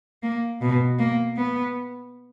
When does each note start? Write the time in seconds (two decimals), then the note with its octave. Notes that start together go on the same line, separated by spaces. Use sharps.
0.23 A#3
0.62 B2
0.99 A#3
1.37 B3